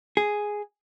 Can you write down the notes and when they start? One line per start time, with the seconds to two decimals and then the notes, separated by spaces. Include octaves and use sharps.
0.17 G#4